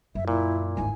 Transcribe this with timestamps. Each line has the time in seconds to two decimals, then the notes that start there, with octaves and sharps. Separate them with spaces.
0.15 F#2 E5
0.28 A#2 E4
0.77 G#1 D#2 G#5